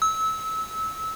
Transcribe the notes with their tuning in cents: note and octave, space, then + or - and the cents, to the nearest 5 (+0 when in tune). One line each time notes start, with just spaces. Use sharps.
E6 -25